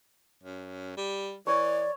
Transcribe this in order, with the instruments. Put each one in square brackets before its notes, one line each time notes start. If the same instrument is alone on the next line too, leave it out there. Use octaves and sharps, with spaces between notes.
[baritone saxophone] F#2
G3
[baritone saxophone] E3 [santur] C#5 [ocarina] D5